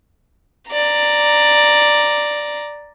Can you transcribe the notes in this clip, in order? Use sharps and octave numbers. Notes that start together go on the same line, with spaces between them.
D5 A#5